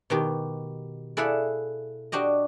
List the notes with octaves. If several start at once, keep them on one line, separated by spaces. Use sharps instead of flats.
B2 D#3 G4
E4 G#4 A4 D5 F5 F#5
D4 F#4 G4 D#5